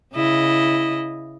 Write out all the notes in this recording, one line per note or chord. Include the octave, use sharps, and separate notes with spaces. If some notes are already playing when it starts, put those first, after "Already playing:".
C#3 E4 D#5